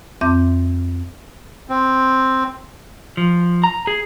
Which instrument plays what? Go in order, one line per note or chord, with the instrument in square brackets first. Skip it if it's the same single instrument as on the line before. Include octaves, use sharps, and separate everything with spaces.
[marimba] F2 C4 E5 D6 G6
[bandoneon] C4
[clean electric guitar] F3
A#5
G#4